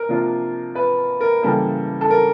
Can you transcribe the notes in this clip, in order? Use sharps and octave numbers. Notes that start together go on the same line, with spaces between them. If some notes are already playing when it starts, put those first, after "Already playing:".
Already playing: A#4
C3 F3 A#3 D4 F4
B4
A#4
C#3 E3 G3 A#3 A4
A4
A#4